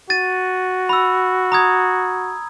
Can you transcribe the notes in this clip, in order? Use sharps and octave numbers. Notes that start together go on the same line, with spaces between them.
F#4 A6 D#7
B5 E6
A#5 D#6 G#6